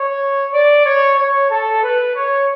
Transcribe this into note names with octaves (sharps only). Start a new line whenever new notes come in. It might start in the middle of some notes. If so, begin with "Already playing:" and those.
Already playing: C#5
D5
C#5
C#5
A4
B4
C#5